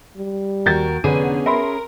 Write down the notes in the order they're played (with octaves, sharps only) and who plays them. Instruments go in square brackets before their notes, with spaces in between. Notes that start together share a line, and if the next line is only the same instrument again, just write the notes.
[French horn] G3
[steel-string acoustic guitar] D#2 F#4 A#4 [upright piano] G6 A6
[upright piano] F1 B4 D#7 [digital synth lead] D3 [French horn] B3 [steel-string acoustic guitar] C#4 G#4
[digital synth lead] A#4 [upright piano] E5 B5 C6